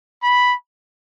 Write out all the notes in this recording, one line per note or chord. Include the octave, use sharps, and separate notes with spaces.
B5